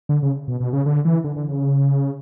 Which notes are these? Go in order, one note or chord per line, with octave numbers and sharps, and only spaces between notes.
D3
C#3
B2
B2
C#3
D3
E3
D3
D3
C#3